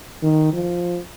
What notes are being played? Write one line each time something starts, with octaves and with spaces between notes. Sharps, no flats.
D#3
F3